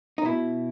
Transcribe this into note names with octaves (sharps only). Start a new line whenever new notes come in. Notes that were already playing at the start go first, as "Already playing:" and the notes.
D#4
B2 E4